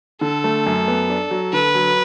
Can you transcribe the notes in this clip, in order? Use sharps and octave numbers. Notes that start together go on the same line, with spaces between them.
D3 A4
A3
F#2
B3
D4
F#3
D3 B4
F#3